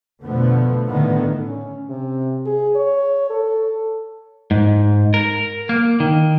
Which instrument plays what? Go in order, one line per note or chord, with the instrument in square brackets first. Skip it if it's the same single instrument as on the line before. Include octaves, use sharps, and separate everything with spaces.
[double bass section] F2 B2 D3 F3 A3 B3
A2 D3 D#3 B3
[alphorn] C#4
C3
G#4
C#5
A4
[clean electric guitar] G#2
A#4
A#3
D#3